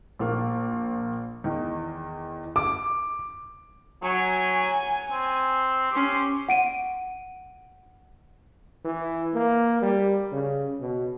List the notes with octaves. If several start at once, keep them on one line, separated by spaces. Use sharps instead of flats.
A#1 A#3
E2 D#3
D6
F#3 G#5
C4
C#4 G4 C6
F#5 D7 D#7
E3
A#3
G3
C#3
B2